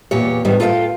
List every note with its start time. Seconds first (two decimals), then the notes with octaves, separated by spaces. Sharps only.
0.11 E2 A#2 G4 C#5
0.45 G#2 D#3 G3 B3
0.60 F4 A4 B4 D#5 F5 G5